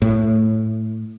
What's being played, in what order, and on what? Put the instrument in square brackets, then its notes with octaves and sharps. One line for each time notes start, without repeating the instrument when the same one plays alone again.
[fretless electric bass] A2